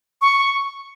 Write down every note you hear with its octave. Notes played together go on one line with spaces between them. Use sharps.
C#6